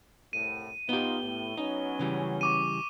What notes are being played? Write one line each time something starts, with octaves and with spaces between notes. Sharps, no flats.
C2 A2 D#7
B3 D#4 F4 G4 G7
A2
F#3 B3 C#4 D#4
C#3 E3 G3
C#6 D6 D#7